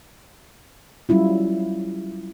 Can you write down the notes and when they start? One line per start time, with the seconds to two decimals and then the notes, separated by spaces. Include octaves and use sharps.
1.09 F#3 G3 C#4 E4 F4